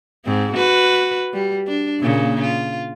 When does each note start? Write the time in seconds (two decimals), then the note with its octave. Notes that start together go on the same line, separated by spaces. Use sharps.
0.25 G#2 C4
0.53 F#4 B4
1.33 G3
1.67 D4
2.01 A#2 C#3 A#3
2.41 F4